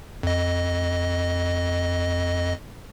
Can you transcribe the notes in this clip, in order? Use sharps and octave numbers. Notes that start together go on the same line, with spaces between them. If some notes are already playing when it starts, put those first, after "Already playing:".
F2 D#5